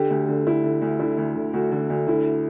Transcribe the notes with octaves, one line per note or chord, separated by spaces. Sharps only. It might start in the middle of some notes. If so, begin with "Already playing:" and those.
Already playing: D3 G4
D2
D3
D2 E4
D3
D2
D3 E4
D2
D3
D2 F#4
D3
D2
D3 E4